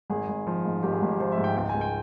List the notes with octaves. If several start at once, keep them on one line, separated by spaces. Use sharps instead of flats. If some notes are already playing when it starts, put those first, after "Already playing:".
G#1 G#4
G#1
F3
G#2
G#1 G4
G#4
G#1
G4
F3 C5
E5
G#2
G5
C#2 G5
G#5
C#2
G5